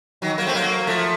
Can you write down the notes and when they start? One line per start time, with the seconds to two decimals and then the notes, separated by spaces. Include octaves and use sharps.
0.22 D#3 F#3
0.38 F#3 A#3
0.47 A3 C4
0.55 F#3 A#3
0.87 F3 A3